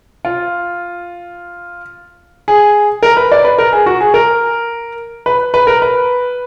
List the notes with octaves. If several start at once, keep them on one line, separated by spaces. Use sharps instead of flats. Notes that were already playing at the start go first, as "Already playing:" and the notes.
F4
G#4
A#4
B4
D5
B4
A#4
G#4
F#4
G#4
A#4
B4
B4
A#4
B4